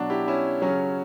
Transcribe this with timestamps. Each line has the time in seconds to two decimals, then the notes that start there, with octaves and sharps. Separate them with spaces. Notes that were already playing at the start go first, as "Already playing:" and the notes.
Already playing: B2 F#3 D4 F#4
0.10 E4 G4
0.28 C#4 E4
0.62 C#3 F#3 C#4